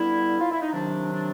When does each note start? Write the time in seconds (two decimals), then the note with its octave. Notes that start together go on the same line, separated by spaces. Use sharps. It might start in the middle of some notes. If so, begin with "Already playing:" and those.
Already playing: G2 D3 G3 B3 E4
0.40 F4
0.51 E4
0.62 D#4
0.73 C3 D#3 F#3 D4
1.13 D4